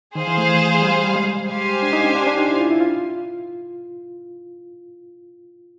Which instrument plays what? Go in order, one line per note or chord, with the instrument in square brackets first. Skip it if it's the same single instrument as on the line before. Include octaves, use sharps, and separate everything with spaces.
[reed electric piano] D#3 [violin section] G#4 C5 F5
[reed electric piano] E3
A3
G3
G3
G#3
[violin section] G4 C5 F5 G#5
[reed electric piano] D4
D#4
C#4
D4
D4
D#4
E4
F4
E4
F4